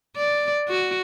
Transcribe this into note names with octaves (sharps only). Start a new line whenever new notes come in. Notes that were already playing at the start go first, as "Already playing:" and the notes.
D5
F#4